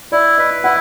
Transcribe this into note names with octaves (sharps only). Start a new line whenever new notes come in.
E4 D5
B4 D#5
E4 F#5